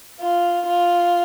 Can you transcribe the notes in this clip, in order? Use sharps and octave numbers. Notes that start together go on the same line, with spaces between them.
F4
F4